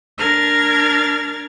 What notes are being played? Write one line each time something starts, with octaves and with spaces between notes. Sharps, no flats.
D4 A#4 A#5 F6 G#6 A6